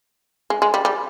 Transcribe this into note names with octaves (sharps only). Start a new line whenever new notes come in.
G#3
G#3
G3
G3